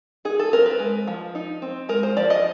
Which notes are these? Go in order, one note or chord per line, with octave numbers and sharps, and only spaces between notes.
D#4 G#4
A4
C4 A#4
B4
G#3
F3
D#4
C4
G#3 A#4
C5
F3 D5
D#5